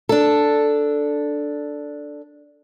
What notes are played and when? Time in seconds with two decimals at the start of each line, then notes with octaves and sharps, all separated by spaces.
0.09 D4 A4